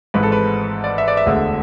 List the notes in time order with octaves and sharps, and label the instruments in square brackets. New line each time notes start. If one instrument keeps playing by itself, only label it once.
[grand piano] G#1 G#2 E3 G#3 B4
A4
B4
D5
E5
D5
E5
E1 D2 D3 G#3